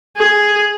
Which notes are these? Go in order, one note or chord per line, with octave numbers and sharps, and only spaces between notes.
G#4